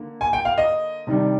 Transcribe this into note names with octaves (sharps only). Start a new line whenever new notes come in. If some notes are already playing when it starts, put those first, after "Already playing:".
Already playing: D3 A#3
G#5
G5
F5
D#5
C3 D#3 G3 D4